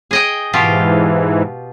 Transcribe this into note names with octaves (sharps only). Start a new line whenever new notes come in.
G#4 D#5 G5
G#2 B2 E3 F4 G4